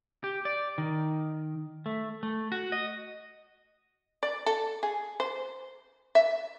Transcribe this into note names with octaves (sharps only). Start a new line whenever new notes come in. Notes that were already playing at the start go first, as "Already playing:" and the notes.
G4
D5
D#3
A3
A3
F#4
D#5
D5
A4
G#4
C5
E5